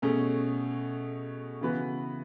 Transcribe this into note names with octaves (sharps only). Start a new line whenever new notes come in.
B2 A3 C#4 G#4
C#3 E3 B3 F#4 B4